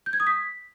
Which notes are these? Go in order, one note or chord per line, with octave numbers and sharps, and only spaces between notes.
G6
G#6
D#6
B6